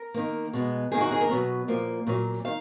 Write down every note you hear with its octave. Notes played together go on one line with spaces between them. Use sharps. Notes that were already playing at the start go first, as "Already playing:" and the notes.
Already playing: A#4
D#3 A#3
B2 G#3 B3
D#3 A#3 G#4
F#4
G#4
A#4
B2 F#3 B3
A#2 F3 A#3
A#2 F#3 A#3
D#3 F5